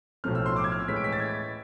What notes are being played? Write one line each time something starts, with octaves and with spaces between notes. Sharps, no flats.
B1 A2 F3 A3 C4 F6
E6
C6
D6
G#6
F6
E6
A2 E3 G#3 B6
D7
B6
A6
G#6